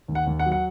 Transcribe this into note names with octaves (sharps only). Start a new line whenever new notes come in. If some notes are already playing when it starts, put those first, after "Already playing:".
D#2
F#5
D#2
F#5
F#3
F#5